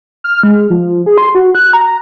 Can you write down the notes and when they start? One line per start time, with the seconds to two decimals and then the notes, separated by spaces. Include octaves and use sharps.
0.24 F6
0.43 G#3
0.70 F3
1.06 G#4
1.18 C6
1.35 F#4
1.55 F#6
1.73 A#5